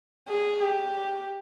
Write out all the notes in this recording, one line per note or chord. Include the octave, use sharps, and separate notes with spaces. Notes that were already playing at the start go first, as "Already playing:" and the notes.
G#4
G4